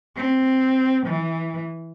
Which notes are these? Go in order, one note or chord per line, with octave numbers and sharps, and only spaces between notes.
C4
E3